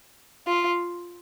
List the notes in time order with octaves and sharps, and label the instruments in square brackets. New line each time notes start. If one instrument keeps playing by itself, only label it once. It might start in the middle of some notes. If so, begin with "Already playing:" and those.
[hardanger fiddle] F4